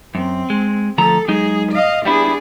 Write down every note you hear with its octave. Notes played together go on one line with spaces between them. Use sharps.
F#2 C4
G#3
D2 F3 A4 A#5
F#3 G#3 D#4 G#4
D#5 F5
G3 B3 D4 E4 G#4